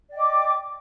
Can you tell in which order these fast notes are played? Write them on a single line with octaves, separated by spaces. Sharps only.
D5 G5 D#5 D6